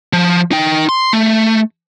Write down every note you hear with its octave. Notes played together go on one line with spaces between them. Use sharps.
F3
D#4 G5
C6
A3